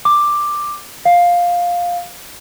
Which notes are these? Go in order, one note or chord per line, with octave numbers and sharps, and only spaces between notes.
D6
F5